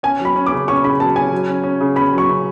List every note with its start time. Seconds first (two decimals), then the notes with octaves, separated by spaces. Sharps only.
0.03 C#4 G#5
0.20 F#3
0.25 B5
0.36 C#4
0.46 D6
0.52 C#3
0.68 C#4 C#6
0.84 C#3 B5
1.00 F#3 A5
1.16 C#4 G#5
1.32 F#3
1.48 C#4
1.64 C#4
1.81 C#3
1.96 C#4 B5
2.13 F#3
2.18 C#6
2.29 C#3